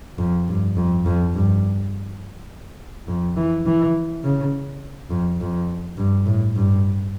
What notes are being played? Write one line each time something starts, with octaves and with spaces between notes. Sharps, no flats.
F2
G2
F2
F2
G2
F2
E3
E3
C#3
F2
F2
G2
A2
G2